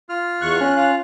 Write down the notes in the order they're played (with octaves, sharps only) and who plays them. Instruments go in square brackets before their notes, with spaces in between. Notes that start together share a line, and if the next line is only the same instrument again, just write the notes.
[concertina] F4 F6
[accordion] E2 C#6 F#6
[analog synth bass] C#4 [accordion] F#6
[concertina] F4 F5